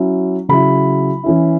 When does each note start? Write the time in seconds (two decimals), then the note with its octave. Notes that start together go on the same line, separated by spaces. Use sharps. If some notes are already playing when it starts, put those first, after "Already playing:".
Already playing: F#3 C#4 E4
0.49 C#3 F#3 E4 B5
1.24 E3 C#4 E4